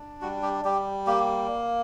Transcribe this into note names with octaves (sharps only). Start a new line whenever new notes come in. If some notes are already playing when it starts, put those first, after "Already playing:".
Already playing: D4
G3 F#4
G4
G3 G4
A#3 G4